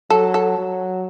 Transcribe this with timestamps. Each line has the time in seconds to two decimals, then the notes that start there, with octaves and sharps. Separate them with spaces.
0.10 F#3 A4
0.34 A4
0.57 F#3